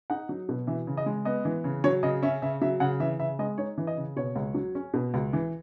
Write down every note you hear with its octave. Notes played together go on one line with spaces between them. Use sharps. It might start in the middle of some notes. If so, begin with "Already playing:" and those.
D#4 F#5
F#3
B2
E3 E5
C#3
D#5
G#3
B3 D#5
E3
C#3
F#3 C#5
C#3 D#5
C#4 E5
C#3 E5
F#3 E5
C#3 F#5
E3 E5
C#3 E5
G#3 D#5
D#4 C#5
E3
D#5
C#3
B2 C#5
C#2
F#3
C#4
B2
C#2
E3